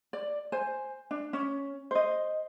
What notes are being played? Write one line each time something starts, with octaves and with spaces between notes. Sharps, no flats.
D5
C5 G#5
D4
C#4
C5 D#5